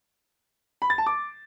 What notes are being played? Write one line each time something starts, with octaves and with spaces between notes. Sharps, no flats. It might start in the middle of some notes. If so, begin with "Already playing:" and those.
B5
A6
A5
D6